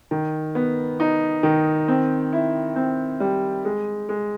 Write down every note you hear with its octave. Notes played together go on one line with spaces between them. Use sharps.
D#3
B3
D#4
D#3
C4
E4
C4
G3
G#3
G#3